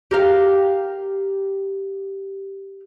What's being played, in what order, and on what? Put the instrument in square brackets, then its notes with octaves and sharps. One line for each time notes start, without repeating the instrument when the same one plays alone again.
[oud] G4 A#4 F5